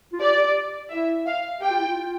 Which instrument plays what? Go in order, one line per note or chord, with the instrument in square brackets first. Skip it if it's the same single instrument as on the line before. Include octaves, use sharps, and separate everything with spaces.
[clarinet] F4
[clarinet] G4 [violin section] D5
[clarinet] E4 [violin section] E5
[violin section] F5
[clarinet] G4 [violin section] G5
[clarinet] F4
E4
F4